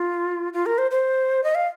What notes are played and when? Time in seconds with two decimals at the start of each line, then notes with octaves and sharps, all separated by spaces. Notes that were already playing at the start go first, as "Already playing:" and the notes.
Already playing: F4
0.53 F4
0.66 A#4
0.78 C5
0.91 C5
1.44 D#5
1.55 F5